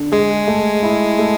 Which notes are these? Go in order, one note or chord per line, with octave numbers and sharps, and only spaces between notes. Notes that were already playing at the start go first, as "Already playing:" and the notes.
Already playing: D3
G#3 G#4
A3
E4
A3